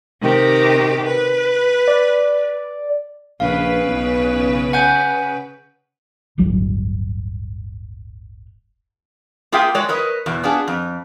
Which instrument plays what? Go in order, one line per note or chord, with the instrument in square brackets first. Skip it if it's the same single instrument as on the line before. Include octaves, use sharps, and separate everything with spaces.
[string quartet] C3 D#3 G4
B4
[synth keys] D5
[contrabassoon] A#1 [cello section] C#3 B4 [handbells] F5
[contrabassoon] B1
[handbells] F#5 G#5 G6
[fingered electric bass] D1 G1 G2 F#3
[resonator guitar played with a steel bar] A#3 F4 G#4 E5 G5
G#3 F#4 C#5 D5
A#4 B4 C#5 D#5
E2 B2
B3 D4 F4 G#4
F2